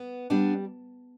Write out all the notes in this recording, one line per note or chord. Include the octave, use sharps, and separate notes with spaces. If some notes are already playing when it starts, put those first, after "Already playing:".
Already playing: B3
G3 B3 D4